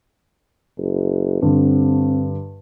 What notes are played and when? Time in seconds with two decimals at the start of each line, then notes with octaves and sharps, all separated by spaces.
0.78 F#1
1.42 G2 D3 C4